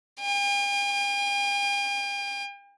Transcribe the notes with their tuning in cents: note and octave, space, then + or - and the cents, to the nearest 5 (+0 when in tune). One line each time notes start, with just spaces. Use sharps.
G5 +45